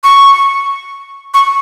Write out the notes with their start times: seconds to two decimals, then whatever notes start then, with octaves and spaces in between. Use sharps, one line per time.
0.04 C#6
1.34 C#6